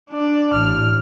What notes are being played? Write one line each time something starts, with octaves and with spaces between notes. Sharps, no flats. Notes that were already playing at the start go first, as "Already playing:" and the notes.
D4 D5
A1 F6